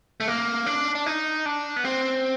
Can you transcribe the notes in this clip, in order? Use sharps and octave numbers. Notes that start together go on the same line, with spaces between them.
A3
A#3
D4
D4
D#4
D4
B3
C4